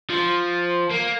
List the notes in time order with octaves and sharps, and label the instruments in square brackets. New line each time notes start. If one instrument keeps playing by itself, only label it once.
[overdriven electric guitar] F3
A#3